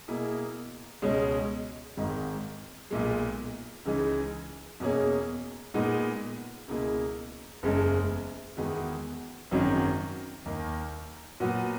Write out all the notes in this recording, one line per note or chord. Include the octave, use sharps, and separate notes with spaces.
B2 A#3 E4 G#4
C#2 B2 G#3 C#4
G#1 G#2 D#3 G#3
B1 A#2 G#3
C#2 C#3 E3 G#3 D#4
E2 B2 A#3 C#4 G#4
A#2 G#3 B3 D#4
C#2 B2 A#3 E4 G#4
F#1 E2 C#3 G#3
E2 D#3 G#3 B3 F#4
G#1 F#2 D#3 F#3
D#2 D#3 A#3
A#2 F#3 B3 F#4